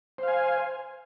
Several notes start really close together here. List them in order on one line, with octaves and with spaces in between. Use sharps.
C5 F5 G#5